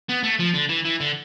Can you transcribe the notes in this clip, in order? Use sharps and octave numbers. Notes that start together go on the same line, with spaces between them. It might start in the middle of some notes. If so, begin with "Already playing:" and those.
B3
A3
F3
D3
E3
E3
D3